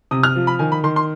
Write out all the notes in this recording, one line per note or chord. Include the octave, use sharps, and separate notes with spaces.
C3 D#6
F6
F3
B5
D#3 G#5
B5
D#3 C6
C6